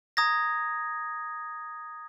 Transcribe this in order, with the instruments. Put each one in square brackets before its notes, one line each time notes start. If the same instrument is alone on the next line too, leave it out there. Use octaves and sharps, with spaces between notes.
[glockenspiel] A#5 D#6 G#6 A#6